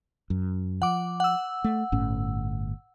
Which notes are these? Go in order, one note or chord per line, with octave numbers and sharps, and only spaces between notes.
F#2
F3 F#5 D6
F#5 E6
A3
G1 A2 C#4